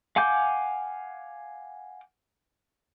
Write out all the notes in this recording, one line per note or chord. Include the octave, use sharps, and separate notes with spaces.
F5 F#5 G#5 D6 G6